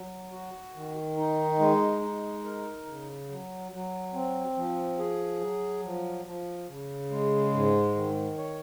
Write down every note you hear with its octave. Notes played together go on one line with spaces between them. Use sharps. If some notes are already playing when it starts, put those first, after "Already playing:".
Already playing: F#3
F#4
D#3
D#4
G#3
D#4
A#4
C#3
F#3
F#3
C4
F3
G#4
F#3
F3
F3
C#3
G#3
G#2
D#3
C#5